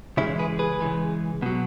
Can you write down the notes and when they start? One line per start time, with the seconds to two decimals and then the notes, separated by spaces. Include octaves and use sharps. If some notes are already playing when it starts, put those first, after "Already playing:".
0.17 C#3 E3 G#3 C#4 E4
0.39 G#4 B4
0.59 G#4 B4
0.80 C#3 E3 G#3
1.42 B2 F#3